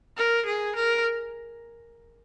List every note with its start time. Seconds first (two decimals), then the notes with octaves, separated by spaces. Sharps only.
0.17 A#4
0.46 G#4
0.76 A#4